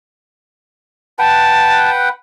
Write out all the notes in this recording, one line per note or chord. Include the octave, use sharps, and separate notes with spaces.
B4 F#5 G5 A5